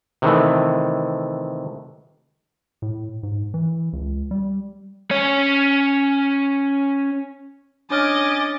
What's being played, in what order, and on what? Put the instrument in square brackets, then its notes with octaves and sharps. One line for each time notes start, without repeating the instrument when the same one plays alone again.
[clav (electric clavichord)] C3 D#3 E3 A3
[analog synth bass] A2
G#2
E3
C#2
G3
[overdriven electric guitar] C#4 C#5
[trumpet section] C#4 G#5 [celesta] D4 C#5 F6 [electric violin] D#5 A6 [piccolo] D6